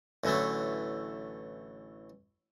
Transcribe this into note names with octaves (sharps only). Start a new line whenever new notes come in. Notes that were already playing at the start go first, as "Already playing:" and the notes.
A1 D3 E3 F#3 A3